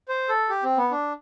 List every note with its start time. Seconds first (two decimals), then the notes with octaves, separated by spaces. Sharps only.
0.08 C5
0.29 A4
0.49 G4
0.63 C4
0.77 B3
0.91 D4